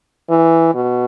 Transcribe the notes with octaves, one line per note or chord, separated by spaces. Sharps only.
E3
B2